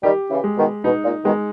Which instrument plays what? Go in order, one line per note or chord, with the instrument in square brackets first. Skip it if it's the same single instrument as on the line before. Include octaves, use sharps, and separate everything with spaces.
[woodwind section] D#3 G3 [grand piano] G4
[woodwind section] C#3 E3
[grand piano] G#3
[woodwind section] B2 D#3
[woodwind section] B2 [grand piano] D#4
[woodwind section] A#2
[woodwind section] B2 D#3 [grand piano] G#3